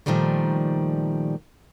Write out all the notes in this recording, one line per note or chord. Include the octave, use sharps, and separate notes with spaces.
A#2 D#3 F3 G3 A3